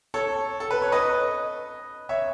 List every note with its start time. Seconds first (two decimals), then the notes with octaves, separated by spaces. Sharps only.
0.14 A4 C#5
0.60 A4
0.71 B4
0.82 C#5
0.92 B4 D#5
2.09 C#5 E5